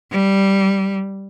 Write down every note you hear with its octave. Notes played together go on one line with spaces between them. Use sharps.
G3